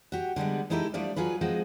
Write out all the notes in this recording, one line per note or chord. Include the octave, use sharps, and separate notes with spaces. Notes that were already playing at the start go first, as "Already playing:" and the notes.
F#4 G4
D3 G3 G#3 B3
G#3 B3 D#4 E4 G4 A4
F3 G3 A3 D4 D5
F#3 F4 G#4 B4
F3 G#3 C4 F#4